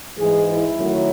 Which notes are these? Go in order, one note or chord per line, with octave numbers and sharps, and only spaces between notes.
G#2 E3 G#3 G#4
E4
F#2 D#3 F#3 A3